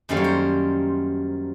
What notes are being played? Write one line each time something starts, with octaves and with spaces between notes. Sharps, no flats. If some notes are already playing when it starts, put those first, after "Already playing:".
F#2 D#3 G3 A#3 C5
C#5
C5